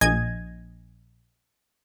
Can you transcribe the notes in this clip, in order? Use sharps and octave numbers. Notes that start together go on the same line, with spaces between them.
A#1 D#5 G#5 G#6